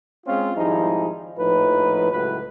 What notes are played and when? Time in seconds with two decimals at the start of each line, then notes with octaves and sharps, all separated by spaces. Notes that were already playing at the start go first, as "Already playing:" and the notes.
0.26 G#3 C4 C#4 F4
0.56 G#1 F3 G3 D#4 E4 G#4
1.38 A#1 A2 F3 D#4 B4
2.11 C#2 A2 F#3 B4